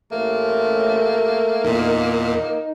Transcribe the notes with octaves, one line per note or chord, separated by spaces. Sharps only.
A1 A3 A#3
E2 A#2 D#4